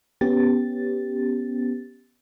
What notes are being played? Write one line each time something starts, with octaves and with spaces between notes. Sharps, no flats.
B3 C#4 G4 A6